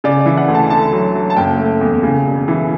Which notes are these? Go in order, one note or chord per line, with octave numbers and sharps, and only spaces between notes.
C#3 D5
D5
E3
F#5
D2
A5
D3 A5
F#3
F#3
A5
F#1 G5
A3
E2
C#3
E1
E3